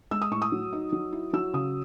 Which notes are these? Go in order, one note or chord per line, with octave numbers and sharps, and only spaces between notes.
G#3 E6
D#6
A2 C#6
D#6
F#3
D#4
F#3
E4
F#3 E6
C#3 D#6